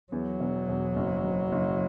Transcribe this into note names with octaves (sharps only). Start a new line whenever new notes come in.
E2 F#3
E1
E1
F#1
F#1
F#1